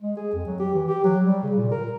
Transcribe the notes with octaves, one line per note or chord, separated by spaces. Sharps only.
G#3
G#4
F2
F#3
G4
E3
G4
F#3
G3
C#3
A#2
A#4